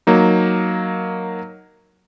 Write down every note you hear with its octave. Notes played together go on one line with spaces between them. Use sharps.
F#3 A#3 D#4